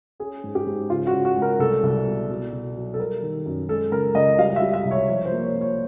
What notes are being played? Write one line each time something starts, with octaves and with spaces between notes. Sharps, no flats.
C#4 G#4
G#2
G4
G#2
C#3 F4
F#4
C#3
F#4
G#3
A#4
C2 A4
C2
B2
B2
B2
F#3
A4
G3 A#4
D#3
F#2
G#3 A4
C#2 A#4
C#2 D#5
G3 F5
E5
G3
E5
C2
C#5
F3 C#5
C5
A#3
C#5
A#3
C#5